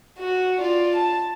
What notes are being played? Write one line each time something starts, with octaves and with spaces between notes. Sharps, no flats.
F#4
F4 D5
A5